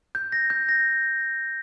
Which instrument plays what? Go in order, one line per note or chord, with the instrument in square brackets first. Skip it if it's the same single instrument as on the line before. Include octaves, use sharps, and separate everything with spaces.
[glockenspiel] G6
A#6
G6
A#6